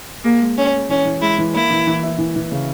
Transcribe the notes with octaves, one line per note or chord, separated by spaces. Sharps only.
A#3 G#4
G#3
C#4 G#4
G#3
E3 C#4
E3
G#3 E4
E3
A#3 E4
E3
E3
E4
E3
E3
C#3